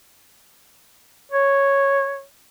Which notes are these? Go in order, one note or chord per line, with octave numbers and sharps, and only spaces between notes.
C#5